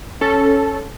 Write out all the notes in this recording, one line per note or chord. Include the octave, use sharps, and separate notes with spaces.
C#4 A4